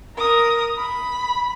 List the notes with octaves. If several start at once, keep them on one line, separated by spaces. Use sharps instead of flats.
A#4 D#6
B5